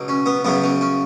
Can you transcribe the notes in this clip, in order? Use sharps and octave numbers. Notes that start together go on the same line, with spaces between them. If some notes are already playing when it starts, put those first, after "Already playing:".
Already playing: C#2 B2 F#3
C#4
B3
F#2 C#3 F#3 B3
C#4
C#4